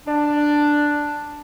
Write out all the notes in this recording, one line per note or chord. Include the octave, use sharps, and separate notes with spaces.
D4